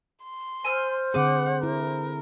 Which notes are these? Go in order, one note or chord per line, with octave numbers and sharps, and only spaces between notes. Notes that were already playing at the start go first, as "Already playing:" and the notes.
C6
C5 G#5 E6 F6
D3 C4 G#4 F#5 D6 D#6
E4 A#4